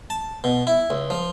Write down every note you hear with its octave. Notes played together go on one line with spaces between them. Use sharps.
A5
B2
E4
C#2
F3